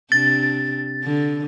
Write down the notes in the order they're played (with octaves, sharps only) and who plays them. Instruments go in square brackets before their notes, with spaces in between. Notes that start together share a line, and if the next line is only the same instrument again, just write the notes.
[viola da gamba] C3 D4 [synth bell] A6
[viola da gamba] D3